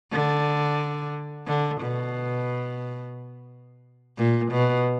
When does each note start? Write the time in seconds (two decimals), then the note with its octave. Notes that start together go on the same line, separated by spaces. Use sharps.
0.12 D3
1.47 D3
1.81 B2
4.18 A#2
4.52 B2